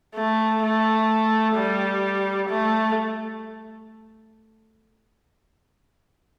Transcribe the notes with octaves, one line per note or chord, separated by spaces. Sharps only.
A3
A3
G3
A3